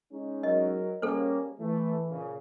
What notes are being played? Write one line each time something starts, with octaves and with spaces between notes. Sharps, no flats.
G#3 C#4 D#4
F#3 A#4 D#5
G3 A#3 C#4 G#4 A4 C5
E3 A3
A#2 C#3